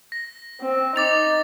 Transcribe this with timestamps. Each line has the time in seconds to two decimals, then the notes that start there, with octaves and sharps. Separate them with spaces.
0.12 A#6
0.61 C4
0.96 D#4 D6 A6 F7